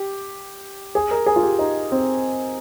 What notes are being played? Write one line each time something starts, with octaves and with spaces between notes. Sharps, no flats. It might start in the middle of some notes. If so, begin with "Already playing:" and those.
Already playing: G4
G#4
A#4
G#4
F4
G4
D#4
C4